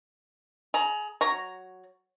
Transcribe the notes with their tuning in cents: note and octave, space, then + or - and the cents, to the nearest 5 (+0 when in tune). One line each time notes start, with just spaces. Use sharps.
G#4 +25 A#5 +0
F#3 +0 A#5 +0 C#6 +0